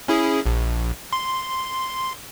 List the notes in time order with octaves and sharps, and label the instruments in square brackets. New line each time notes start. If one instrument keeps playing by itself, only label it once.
[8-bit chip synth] C#4 E4 G#4
A#1
C6